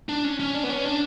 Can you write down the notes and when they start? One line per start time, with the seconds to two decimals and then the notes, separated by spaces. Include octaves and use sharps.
0.09 D4
0.24 C#4
0.40 C#4
0.54 D4
0.64 B3
0.70 C#4
0.86 D4